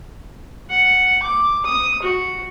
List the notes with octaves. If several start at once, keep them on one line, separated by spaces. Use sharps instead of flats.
F#5
D6
D#6
F#4